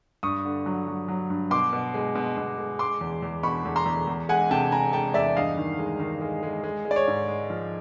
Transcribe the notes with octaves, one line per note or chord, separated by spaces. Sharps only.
G2 C#6 D#6
D3
F#3
F#3
F#3
G2
B2 C6 D6
B2
G#3
B2
B2
G#3
G#3 C6 D6
E2
E2
B2 B5 C#6
E2
A#5 C6
E2
E2
G#3 F#5 G#5
C3 G5 A5
C3 G#5 A#5
G#3 G5 A5
E2 D5 E5
G2 D#5 F5
D#3
G#3
D#3
G#3
G#3
G#3
G#3
D5
C#5
G#2
G#3
F3